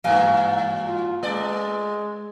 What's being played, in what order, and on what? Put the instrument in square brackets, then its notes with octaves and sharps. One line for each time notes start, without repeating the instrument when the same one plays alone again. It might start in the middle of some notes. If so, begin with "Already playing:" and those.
[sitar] G2 E3 F#3 [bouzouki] A#3 G#5
[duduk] F4
[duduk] G#3 [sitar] A3 D5